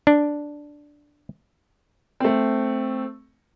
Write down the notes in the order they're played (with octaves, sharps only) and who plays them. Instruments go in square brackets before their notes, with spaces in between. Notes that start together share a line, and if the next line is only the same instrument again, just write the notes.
[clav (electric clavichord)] D4
[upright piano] A3 C4